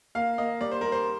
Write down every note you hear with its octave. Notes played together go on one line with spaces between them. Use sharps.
A#3 F5
A#3 D#5
G3 D5
C5
G3 A#4
C5